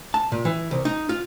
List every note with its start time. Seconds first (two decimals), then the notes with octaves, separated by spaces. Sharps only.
0.14 A5
0.32 A#2
0.45 E3
0.71 C2
0.85 D#4
1.09 F4